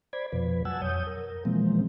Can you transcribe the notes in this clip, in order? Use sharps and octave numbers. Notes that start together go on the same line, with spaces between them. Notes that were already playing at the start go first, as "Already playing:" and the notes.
C5 D5 B5 G#6
F2 B2 F3 B4
F#3 F#5 G#5 A5 E6
F2 C#5 D#6 G6
A#4
B2 E3 F3 G#3 A#3 C4